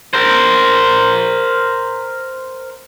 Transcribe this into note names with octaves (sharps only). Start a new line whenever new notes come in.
A#4 C5